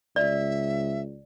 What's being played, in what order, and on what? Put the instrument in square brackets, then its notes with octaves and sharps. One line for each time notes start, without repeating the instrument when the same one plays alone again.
[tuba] C#2 [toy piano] D5 [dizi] E5